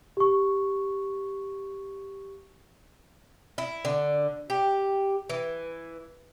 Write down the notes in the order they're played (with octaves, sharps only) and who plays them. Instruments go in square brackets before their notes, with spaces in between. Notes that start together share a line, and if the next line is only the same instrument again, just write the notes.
[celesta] G4 C#6
[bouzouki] E4
D3
G4
E3